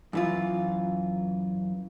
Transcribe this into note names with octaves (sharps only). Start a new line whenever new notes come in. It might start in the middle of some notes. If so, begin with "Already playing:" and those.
F#2 E3 F4